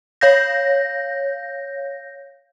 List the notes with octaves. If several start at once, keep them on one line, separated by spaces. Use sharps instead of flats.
C#5 F5 G6 A#6